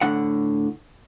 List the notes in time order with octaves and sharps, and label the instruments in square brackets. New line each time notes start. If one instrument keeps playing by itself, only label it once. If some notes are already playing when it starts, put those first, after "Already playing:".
[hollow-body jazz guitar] A2 D3 F#5